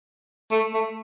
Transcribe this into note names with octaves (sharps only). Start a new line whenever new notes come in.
A3
A3